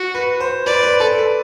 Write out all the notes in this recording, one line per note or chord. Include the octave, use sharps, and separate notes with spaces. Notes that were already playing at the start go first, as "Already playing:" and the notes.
Already playing: F#4
B4
C5
B4 D5
B4
A4
B4